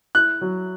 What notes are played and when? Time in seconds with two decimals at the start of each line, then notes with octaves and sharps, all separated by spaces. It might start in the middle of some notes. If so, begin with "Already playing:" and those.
0.15 E4 F#6
0.41 F#3